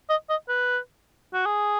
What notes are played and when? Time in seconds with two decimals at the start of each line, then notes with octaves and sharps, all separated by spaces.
0.10 D#5
0.30 D#5
0.49 B4
1.34 F#4
1.46 G#4